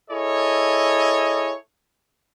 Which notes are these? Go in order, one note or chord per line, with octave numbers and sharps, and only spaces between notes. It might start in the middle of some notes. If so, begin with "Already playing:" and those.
E4 G#4 A4 C#5 D#5